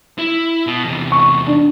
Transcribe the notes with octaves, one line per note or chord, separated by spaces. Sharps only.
E4
B2
E2 C3
C#6
D4